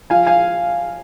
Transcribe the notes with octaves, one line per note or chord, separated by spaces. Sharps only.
F3 F5 G#5
F5 G#5